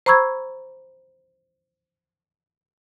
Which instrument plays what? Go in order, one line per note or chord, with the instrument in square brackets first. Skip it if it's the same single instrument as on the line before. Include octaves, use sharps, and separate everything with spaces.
[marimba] C5 A#5 B5 C#6 E6 G#6